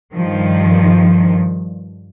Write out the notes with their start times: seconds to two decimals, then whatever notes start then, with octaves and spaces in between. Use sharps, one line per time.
0.13 G2 D#3 F3